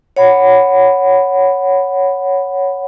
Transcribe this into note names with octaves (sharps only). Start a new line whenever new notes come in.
C#5 F#5 B5